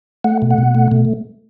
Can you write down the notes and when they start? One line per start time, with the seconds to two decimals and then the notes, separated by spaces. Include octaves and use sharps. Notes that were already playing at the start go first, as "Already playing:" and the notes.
0.24 A3 F#5
0.42 B2
0.51 F#5
0.58 B2
0.75 A3
0.91 B2